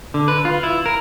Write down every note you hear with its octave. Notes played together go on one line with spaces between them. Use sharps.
D3
B4
F4
E4
A#4